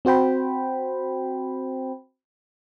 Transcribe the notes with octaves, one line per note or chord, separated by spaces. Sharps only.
C4 F#4 C5 G5 B5